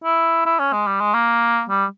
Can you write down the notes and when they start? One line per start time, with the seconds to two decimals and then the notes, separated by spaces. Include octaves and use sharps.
0.04 E4
0.46 E4
0.59 C#4
0.73 G#3
0.87 G3
1.00 G#3
1.14 A#3
1.69 G3